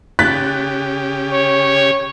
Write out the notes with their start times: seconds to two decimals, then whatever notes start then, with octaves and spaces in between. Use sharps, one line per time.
0.19 C#3 G4 F#6 A6 B6
1.32 C#5